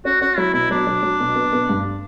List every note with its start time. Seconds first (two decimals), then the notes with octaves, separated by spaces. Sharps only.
0.05 C#4 F#4
0.21 C#4 F#4
0.38 F#3 E4
0.54 B2 E4
0.71 F#3 D4
0.87 F#3
1.03 F#3
1.20 B2
1.36 B3
1.53 B3
1.69 G2